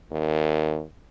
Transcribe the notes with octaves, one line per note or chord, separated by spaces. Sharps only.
D#2